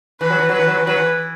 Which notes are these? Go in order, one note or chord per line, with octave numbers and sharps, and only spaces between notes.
E3 B4
F#3
E3
F#3 B4
E3
F#3
E3
F#3 B4
E3